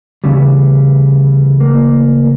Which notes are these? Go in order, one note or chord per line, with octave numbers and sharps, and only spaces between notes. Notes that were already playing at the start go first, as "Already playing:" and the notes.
D2 C#3 E3 G3
A#3